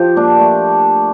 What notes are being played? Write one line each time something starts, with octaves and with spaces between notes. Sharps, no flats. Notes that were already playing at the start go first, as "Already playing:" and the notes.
Already playing: F3 G4
A#2 D4
A3